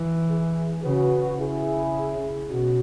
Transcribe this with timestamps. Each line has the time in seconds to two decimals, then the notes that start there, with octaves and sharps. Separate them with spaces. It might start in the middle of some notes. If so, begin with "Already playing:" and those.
Already playing: E3
0.29 E4 G#4
0.84 C#3 F#4 B4
1.39 C#3 E4 G#4
2.50 B2 C#4 F#4